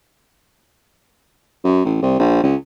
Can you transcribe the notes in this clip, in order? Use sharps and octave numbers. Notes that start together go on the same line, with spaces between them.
F#2
A1
C2
A#1
C#2